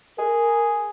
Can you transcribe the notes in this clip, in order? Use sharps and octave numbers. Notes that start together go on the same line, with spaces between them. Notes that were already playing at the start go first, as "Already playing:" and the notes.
G#4 A#4